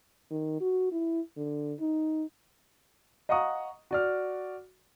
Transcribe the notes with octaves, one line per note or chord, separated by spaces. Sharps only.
D#3
F#4
E4
D3
D#4
D#5 F5 F#5 A#5 C#6 D#6
F#4 D5 F6